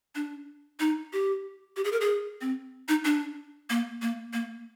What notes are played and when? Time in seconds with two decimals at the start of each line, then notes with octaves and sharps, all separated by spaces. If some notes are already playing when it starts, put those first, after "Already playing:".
0.15 D4
0.80 D#4
1.13 G4
1.76 G4
1.84 G#4
1.92 A#4
2.01 G#4
2.41 C4
2.88 D#4
3.05 D4
3.70 A#3
4.02 A#3
4.33 A#3